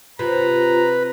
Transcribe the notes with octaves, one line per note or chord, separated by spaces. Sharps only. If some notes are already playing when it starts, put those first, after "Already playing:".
C3 F4 B4 A#5